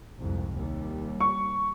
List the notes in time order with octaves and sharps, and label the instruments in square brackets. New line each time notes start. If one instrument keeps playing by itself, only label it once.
[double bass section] C2 F2 G#2
D#2 G3
[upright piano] C#6